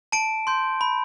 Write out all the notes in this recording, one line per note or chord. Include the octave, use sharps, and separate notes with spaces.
A5 D7
C6 G6
B5